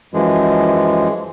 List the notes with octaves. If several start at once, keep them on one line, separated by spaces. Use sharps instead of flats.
F#2 E3 F3 G#3